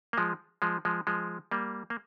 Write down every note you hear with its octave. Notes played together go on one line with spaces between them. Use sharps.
A#3
F3 G#3
F3 G#3
F3 G#3
F3 G#3
G3 A#3
A#3